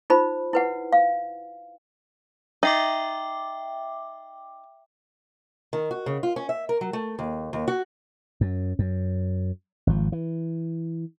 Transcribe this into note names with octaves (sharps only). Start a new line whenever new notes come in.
D#4 F4 C5 B5
E4 B4 F#5
F5
D#4 E5 G5 D6
D#3
F#4
C#3
F4
C#4
E5
A#4
F#3
A3
D#2
D#2
F#4
F#2
F#2
G#1 F3
E3